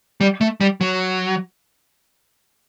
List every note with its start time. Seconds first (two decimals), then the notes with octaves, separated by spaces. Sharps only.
0.21 G3
0.41 A3
0.61 G3
0.81 F#3